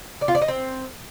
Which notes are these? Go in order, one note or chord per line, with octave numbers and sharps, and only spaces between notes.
D5
F4
D5
D#5
C4